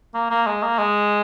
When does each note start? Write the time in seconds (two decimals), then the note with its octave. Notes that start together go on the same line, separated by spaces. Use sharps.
0.14 A#3
0.31 A#3
0.46 G#3
0.63 A#3
0.78 G#3